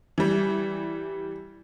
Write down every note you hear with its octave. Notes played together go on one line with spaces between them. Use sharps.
E3 G3